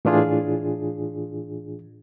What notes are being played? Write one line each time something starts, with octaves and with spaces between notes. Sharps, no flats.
A2 E3 D4 F4 G#4